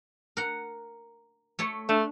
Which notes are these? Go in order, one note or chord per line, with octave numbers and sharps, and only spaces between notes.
A#4 F#5
A3 A4 C#5
A3 D4